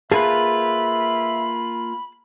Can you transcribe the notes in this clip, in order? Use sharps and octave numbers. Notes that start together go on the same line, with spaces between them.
A#3 F4 G#4 B4 E5 A5 B5